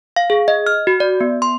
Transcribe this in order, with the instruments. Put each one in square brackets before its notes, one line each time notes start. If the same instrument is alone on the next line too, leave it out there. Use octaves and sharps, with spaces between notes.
[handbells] F5
G#4
D#5
F6
F#4
D5
B3
C6